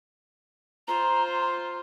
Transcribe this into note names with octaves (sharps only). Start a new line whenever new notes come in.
F4 C5 A#5